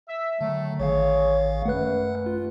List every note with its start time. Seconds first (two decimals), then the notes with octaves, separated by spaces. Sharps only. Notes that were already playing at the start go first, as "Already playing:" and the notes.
0.08 E5
0.41 D3 D#3 F#3 A3
0.80 A1 D#3 G#4 C#5 F5
1.65 F#2 A3 B4 F#5 F#6
2.26 F4